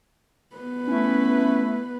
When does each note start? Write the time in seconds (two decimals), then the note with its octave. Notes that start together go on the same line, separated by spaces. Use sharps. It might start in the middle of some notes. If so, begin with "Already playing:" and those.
0.56 B3 B4
0.87 A3 C#4 E4